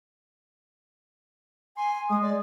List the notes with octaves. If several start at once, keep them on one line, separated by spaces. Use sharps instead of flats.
G#5 C6
G#3 D#6
D5